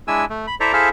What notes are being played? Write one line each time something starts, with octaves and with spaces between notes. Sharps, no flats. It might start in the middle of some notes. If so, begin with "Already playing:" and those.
G#3 D4 E4 G#5 E6
A3
B5
E4 A4 C5 D5 E5 A#5
E4 G#4 A4 C5 E5 F5